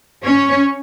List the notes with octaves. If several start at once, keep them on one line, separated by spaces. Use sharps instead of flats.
C#4 C#5